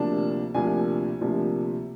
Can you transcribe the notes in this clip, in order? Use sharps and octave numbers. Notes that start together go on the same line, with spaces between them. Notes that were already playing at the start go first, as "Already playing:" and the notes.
Already playing: D2 C3 F3 A#3 D4 A5
D2 C3 F3 A#3 D4 G#5
D2 C3 F3 A#3 D4